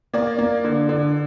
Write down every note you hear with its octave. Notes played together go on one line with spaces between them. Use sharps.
A#3 D5
A#3
D3
D3